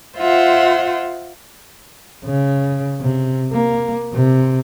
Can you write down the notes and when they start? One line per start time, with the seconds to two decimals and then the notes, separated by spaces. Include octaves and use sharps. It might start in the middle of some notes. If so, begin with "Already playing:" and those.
0.18 F4 C5 E5 F#5
2.24 C#3
3.00 C3
3.52 A#3
4.13 C3